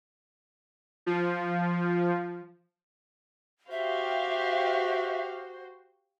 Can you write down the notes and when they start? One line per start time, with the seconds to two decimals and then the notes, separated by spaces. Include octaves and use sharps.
1.06 F3
3.71 F#4 G4 C5 E5 F5